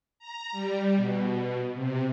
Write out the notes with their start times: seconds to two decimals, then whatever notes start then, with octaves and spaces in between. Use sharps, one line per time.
0.19 A#5
0.52 G3
0.97 B2
1.74 C3